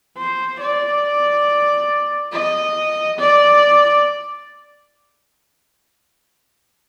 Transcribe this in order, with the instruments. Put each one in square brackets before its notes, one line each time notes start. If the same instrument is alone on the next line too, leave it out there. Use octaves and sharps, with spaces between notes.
[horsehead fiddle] C5
D5
D#5
D5